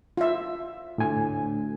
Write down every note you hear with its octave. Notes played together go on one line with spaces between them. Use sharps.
F4 E5
D2 A2 G#5